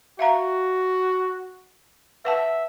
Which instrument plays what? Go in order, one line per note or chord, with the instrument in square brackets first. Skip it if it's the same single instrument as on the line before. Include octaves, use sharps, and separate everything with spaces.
[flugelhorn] F#4 [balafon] E5 F5 A#5
[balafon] B4 F#5 A5 [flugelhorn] E5